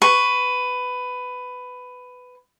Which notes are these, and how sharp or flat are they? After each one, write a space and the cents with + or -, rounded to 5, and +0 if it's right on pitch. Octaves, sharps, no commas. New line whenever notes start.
B4 +15 C#6 +0